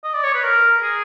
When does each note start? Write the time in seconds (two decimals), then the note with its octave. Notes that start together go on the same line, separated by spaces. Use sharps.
0.04 D#5
0.14 D5
0.23 C#5
0.34 B4
0.44 A#4
0.82 G#4